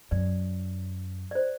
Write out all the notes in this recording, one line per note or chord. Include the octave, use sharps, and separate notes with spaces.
F#2 D5
D5
C5